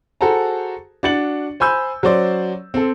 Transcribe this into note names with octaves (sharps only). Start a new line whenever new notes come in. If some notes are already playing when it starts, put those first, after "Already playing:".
F#4 G#4 A4 C5 A5 A#5
D4 F#4 A6 C#7 F#7
C5 G#5 B5 E6 G6
F#3 C#4 C5 D5
C4 A4